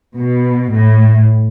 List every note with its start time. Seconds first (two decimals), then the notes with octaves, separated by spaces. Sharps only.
0.17 B2
0.71 A2